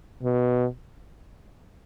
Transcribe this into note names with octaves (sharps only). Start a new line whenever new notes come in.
B2